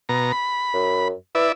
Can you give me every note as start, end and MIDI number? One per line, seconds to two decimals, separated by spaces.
0.09 0.32 47
0.09 0.32 82
0.32 1.08 83
0.74 1.12 42
1.35 1.52 64
1.35 1.47 71
1.35 1.52 74
1.35 1.52 76